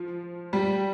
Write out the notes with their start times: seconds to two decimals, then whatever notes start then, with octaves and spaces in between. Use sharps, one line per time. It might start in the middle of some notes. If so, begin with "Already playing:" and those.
Already playing: F3
0.53 G3